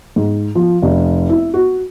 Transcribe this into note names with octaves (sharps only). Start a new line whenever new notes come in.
G#2
F3
F1
E4
F#4